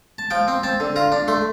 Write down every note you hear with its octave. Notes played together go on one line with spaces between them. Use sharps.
A5
F3 G5
C4
C4 A5
D3
F4 A#5
D4
A3 C6